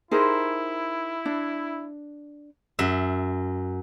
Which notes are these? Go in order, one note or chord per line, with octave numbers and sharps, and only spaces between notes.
D#4 E4 G4 G#4 A#4 C5
D4
F#2 E5